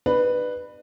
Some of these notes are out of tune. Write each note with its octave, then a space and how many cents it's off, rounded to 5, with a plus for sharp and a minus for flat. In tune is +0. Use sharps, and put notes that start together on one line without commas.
D4 +40 G4 -20 B4 +0